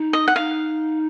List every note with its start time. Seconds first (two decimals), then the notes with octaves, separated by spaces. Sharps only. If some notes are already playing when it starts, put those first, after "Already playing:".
Already playing: D#4
0.13 D#5
0.28 F#5
0.36 D#4 F5